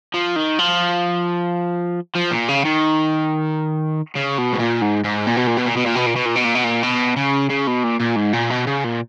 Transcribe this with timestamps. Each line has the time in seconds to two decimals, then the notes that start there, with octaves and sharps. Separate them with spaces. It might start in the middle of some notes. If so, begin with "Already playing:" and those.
0.14 F3
0.36 D#3
0.59 F3
2.15 F3
2.31 A#2
2.48 C#3
2.65 D#3
4.15 C#3
4.38 B2
4.53 G#2
4.59 A#2
4.82 G#2
5.04 G#2
5.27 A#2
5.36 B2
5.47 A#2
5.57 B2
5.66 A#2
5.76 B2
5.85 A#2
5.95 B2
6.06 A#2
6.16 B2
6.25 A#2
6.35 B2
6.44 A#2
6.55 B2
6.64 A#2
6.83 B2
7.16 C#3
7.50 C#3
7.67 B2
7.83 A#2
8.00 A#2
8.16 G#2
8.33 A#2
8.50 B2
8.67 C#3
8.84 A#2